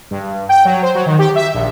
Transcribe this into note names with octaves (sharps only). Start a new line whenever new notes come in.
G2
G5
F#3
C5
F#3
D#3
G4
E5
A#1